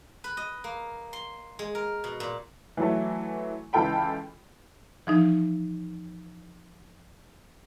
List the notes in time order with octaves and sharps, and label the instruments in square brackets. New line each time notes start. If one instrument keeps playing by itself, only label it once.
[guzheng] B4
D#5
A#3
C6
G#3
A#4
B2
A#2
[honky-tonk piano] E3 F#3 A3
C#2 E3 F4 A4 G5 B5
[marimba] E3 F3 D#4